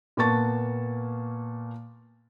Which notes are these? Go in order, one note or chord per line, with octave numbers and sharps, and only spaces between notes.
A#2 A#3 B3 A5 C#6 A6